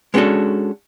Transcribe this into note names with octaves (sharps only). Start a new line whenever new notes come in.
G#3 B3 C#4 D4 F#4 A4